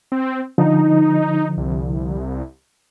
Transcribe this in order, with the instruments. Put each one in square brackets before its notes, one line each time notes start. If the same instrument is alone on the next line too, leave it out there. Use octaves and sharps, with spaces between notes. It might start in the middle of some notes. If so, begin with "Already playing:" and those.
[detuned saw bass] C4
[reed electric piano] D3 F3 [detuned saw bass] D#4
[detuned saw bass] C2